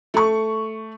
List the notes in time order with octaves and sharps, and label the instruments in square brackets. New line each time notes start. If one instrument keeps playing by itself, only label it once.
[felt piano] A3 C#6